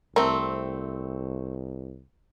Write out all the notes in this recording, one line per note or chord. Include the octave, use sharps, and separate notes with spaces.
C2 A3 C4 A#4